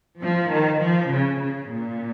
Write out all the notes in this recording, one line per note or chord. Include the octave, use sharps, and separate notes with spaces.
F3
D#3
F3
C#3
C#3
A#2